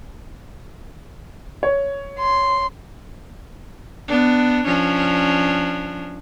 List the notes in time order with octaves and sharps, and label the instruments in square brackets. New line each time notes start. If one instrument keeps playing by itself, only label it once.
[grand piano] C#5
[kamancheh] C6
[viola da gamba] B3 D4
F3 C#4 D4